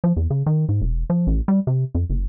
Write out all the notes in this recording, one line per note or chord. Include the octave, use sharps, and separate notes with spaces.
F3
E2
C#3
D#3
G#2
E1
F3
A1
G3
C3
F2
F#1